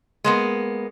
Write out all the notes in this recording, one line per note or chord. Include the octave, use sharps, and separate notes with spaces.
G#3 A#3 B3